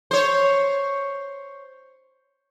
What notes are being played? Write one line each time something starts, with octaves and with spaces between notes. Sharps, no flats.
C5 C#5